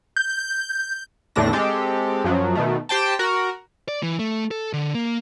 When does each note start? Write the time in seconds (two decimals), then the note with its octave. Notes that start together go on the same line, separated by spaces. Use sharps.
0.16 G6
1.36 E2 A2 D3 A3 D4 A#6
1.53 G#3 C4 G4 A4
2.24 F#2 F3 F#3
2.55 B2 D#3 A3
2.89 G4 C5 G5 A5
3.19 F#4 A#4
3.88 D5
4.03 E3
4.19 A3
4.51 A4
4.73 D3
4.94 A#3